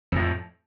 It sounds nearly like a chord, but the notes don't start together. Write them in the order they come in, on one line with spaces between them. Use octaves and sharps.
F2 A2 F3